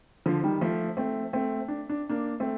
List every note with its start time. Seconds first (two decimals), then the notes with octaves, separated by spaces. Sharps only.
0.26 D3 F3
0.44 D#3 G3
0.61 F3 A3
0.97 A3 C4
1.33 A3 C4
1.68 D4
1.89 D4
2.09 A#3 D4
2.40 A3 C4